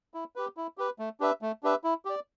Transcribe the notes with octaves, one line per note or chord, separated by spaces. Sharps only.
E4
G4 B4
E4
G4 B4
A3
D4 G4 B4 E5
A3
D4 G4 B4 E5
E4
G4 D5